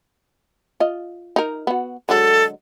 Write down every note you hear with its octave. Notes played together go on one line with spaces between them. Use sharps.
F4 D#5
D#4 A#4
B3 F#4
D3 F#3 G#3 A4